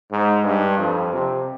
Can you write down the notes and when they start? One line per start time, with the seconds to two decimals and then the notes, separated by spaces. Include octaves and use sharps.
0.11 G#2
0.45 G2
0.79 F2
1.13 C3